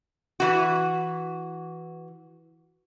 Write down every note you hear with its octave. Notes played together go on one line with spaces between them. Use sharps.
E3 F#4